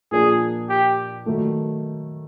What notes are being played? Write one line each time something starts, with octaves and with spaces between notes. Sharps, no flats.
A#2 F3 A#3 D4 G#4
G4
D#3 F#3 A3